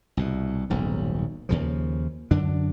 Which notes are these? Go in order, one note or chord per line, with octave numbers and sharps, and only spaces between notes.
C2 B2
D#1 B1 G#2
D#2 C#3 F3
F#2 D3 D4